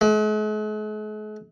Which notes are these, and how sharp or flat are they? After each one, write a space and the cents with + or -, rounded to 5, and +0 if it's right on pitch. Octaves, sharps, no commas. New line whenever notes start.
G#3 +45